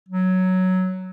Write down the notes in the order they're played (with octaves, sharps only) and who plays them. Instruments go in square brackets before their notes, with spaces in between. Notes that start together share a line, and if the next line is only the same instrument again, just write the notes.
[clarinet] F#3